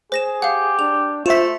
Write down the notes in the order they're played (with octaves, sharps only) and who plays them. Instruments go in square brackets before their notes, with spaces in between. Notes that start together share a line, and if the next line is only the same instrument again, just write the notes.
[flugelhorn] G#4 [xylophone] C5 A#6 E7
[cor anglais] G4 [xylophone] F5 F#5
[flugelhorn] D4 [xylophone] F7
[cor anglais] A3 [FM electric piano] F4 E5 [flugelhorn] C5 [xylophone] B6 E7